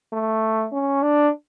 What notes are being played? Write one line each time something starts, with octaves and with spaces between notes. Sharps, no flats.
A3
C#4
D4